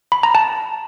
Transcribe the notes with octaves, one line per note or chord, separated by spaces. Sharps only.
B5
A#5
A5